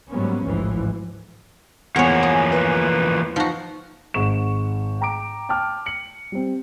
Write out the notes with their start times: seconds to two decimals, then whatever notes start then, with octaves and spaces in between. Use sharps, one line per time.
0.10 G#2 F#3 G3 A#3 B3 C#4
0.45 A1 D2 G#2 E3 F3
1.96 E2 E3 F3 A#3 C#5 F#5
2.23 G#4
2.52 B4
3.36 F3 D#4 F#4
4.14 G#1 G#2 C#6 E7
5.01 G5 A#5 D6 D7
5.49 G5 A5 D6 F6
5.86 C#7 F#7
6.32 G3 C4